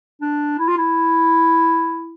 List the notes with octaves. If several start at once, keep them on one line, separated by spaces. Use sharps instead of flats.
D4
E4
F4
E4